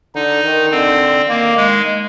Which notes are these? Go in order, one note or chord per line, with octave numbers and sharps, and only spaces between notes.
D3 D#4
D#3
D3 C4
D#3 A#3
G#3